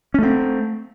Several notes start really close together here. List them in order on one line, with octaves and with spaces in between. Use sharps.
C#4 A3 C4